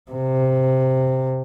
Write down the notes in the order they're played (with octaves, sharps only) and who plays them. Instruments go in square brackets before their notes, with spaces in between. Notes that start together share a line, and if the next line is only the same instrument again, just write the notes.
[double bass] C3